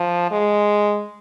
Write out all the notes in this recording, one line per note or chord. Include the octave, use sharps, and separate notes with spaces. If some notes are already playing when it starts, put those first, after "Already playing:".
Already playing: F3
G#3